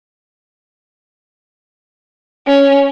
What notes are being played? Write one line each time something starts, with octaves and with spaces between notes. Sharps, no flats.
C#4